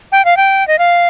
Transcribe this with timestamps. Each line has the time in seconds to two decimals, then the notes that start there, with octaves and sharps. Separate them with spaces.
0.12 G5
0.25 F5
0.37 G5
0.68 D#5
0.79 F5